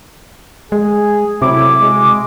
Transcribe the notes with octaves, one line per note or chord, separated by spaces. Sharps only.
G#3 G#4
A2 C3 F#3 E4 D6
G#3